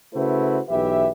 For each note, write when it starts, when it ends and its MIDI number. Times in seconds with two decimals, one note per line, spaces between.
0.14 0.59 49
0.14 0.59 57
0.14 0.59 64
0.14 0.59 66
0.14 0.59 71
0.14 0.59 72
0.69 1.10 35
0.69 1.10 52
0.69 1.10 67
0.69 1.10 71
0.69 1.10 76